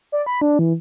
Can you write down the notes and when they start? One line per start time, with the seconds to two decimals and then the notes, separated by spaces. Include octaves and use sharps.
0.12 D5
0.26 B5
0.41 D4
0.59 E3